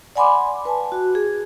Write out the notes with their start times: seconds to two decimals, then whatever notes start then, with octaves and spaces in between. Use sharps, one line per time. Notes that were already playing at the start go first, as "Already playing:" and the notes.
0.16 D5 F#5 G#5 B5 C6 D6
0.65 B4 G#5 A5
0.92 F#4
1.15 G#4